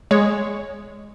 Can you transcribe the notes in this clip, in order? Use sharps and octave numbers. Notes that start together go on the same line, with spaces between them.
G#3 C#5